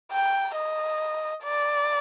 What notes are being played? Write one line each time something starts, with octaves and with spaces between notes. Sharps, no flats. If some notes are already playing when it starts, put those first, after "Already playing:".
G5
D#5
D5